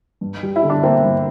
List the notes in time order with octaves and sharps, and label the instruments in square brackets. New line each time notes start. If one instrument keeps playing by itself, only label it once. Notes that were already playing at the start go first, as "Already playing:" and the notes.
[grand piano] G2
G3
[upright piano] E4
[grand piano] D3
[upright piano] D4
[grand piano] A#3 [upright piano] C4
[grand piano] G2